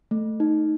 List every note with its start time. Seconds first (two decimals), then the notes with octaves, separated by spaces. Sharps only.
0.11 A3
0.40 D#4